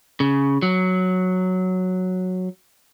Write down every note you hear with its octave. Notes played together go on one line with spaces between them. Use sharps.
C#3
F#3